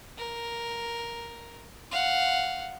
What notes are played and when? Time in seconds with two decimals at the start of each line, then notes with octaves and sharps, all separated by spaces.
0.18 A#4
1.91 F5 F#5